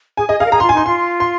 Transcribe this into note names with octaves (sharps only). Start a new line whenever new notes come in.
G#4 G#5
G#4 D#5
G#4 F5
A#4
G#4 A#5
F4 C6
G#5
D#4 C6
F4 C6
C6